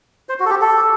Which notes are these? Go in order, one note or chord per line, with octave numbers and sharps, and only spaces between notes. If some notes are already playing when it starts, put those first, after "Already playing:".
C5
F#4
A4
G4
A4